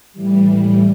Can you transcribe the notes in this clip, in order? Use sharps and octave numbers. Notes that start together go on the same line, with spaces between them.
A2 E3 G3